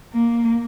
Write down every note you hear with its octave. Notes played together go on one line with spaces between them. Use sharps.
A#3